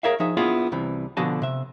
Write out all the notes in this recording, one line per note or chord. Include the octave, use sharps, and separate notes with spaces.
G#4 A#4 C#5 E5 F5
F3 D#4 G#4 E5
B3 D4 E4 F4 G#4
C2 C3 E3
B2 D3 F3 F#4 G#5 A5
C3 E5